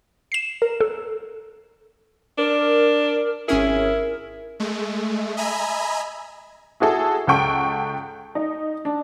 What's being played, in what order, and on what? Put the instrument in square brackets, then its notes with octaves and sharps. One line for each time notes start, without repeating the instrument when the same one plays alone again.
[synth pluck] C7 E7
[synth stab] A#4
[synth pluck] A4
[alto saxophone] D4 [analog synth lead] A#4
[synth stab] G#1 C#4 G#4 [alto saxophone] E4 [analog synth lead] A#4
[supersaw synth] G#3 A3
D#5 E5 G#5 A#5 B5
[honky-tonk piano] E4 F#4 G#4 A4
C#2 A4 F#5 G5 C#6 D7
D#4
D4